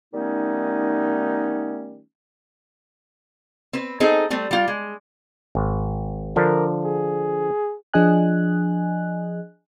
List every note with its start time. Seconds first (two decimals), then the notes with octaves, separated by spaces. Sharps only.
0.14 D#3 G3 A3 B3 C#4 D#4
3.73 C4 B4
4.00 C4 D#4 G#4 A4
4.30 G3 A3 C4
4.51 G3 F4
4.68 G#3
5.55 G#1
6.36 D3 F3 D4 A#4
6.85 G#4
7.94 F3 D4 G#4 D#5 G#5 F#6